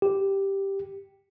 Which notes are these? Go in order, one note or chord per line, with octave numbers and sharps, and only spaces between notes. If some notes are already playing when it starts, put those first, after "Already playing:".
G4